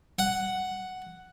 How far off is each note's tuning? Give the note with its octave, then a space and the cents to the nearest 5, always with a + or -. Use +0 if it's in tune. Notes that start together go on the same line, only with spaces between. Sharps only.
F#5 +5